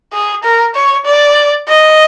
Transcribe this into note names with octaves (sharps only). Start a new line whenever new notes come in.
G#4
A#4
C#5
D5
D#5